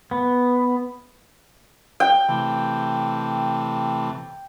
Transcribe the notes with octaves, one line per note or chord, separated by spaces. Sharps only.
B3
G5
C3 E3 A3